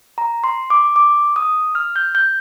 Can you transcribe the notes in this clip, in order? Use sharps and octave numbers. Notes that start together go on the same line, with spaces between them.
A#5
C6
D6
D6
D#6
F6
G6
G6